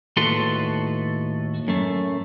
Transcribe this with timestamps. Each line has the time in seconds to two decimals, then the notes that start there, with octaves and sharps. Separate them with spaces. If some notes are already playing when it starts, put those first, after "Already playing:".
0.17 D#2 A2 F#4 A4 B4 C6
1.68 F#2 A3